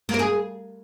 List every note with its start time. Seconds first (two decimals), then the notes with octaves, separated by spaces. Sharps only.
0.09 A#3
0.14 A#4
0.19 G#4